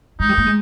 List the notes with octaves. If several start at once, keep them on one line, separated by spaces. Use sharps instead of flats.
G#3 D#4
G3
A#3
G#3